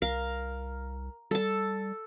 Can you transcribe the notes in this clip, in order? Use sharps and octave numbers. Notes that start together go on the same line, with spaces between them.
C2 A#4 F5
G3 A4 A5